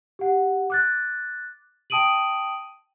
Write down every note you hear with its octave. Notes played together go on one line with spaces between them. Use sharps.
G4 F#5
D6 F#6 A6
G5 A5 D#6 D7 D#7 F#7